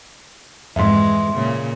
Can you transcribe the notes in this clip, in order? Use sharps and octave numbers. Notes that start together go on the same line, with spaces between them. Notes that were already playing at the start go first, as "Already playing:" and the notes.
F2 G#2 E3 G#3 E5 C6
A#2 C#3